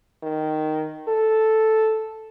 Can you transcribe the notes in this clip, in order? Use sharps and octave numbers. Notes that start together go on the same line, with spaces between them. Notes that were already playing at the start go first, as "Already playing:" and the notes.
D#3
A4